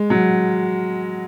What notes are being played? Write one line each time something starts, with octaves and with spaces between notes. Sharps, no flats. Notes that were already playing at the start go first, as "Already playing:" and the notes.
Already playing: G#3
F#3